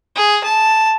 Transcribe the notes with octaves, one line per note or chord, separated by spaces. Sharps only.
G#4
A5